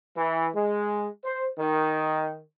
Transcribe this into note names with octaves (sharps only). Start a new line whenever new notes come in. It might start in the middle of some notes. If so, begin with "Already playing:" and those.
E3
G#3
C5
D#3